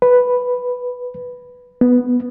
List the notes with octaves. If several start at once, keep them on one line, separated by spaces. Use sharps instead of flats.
B4
B3